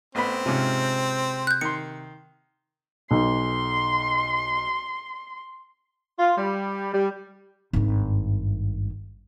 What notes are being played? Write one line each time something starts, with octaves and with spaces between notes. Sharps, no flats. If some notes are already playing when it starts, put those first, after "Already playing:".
A1 B3 C4 B5
G#2 C3 C#4 F4
F#6 G6
D#3 C6 C#7
B1 C6
F4
G3
G3
G#1 G2